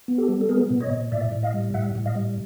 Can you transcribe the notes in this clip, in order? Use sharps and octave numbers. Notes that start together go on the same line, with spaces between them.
B3
G4 A4
G3
A4
B3 G#4 A#4
A#2
C#5 D#5
A#2
A2 D5 E5
A2
D#5 F5
G3
A2 E5 F#5
A2
D#5 F5
G3